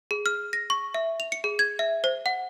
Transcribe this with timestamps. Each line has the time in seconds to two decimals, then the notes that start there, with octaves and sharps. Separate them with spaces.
0.11 G#4
0.26 F6
0.53 A#6
0.70 C#6
0.94 E5
1.20 F7
1.32 C#7
1.44 G#4
1.59 G#6
1.79 E5
2.04 C5
2.26 F#5